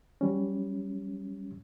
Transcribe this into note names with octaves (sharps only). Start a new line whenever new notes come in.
F#3 G3 C#4